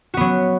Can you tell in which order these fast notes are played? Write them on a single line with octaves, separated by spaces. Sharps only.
F#4 B3 F#3